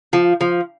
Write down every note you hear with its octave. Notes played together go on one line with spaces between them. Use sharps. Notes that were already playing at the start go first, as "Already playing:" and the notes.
F3
F3